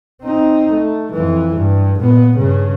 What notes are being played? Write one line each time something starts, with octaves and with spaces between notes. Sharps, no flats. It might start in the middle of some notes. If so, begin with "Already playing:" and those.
C4 D#4
A3
F2 E3
G2
A#2 B3
G2 C#3